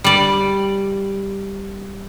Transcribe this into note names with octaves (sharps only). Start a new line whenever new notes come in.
G3 D5